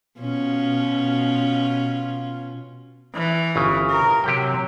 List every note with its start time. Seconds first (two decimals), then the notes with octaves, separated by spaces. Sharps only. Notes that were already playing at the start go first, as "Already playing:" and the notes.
0.20 B2 C#4 F4
3.15 E3
3.56 G1 C#3
3.91 A#4
4.24 C3 F#3 G4 G5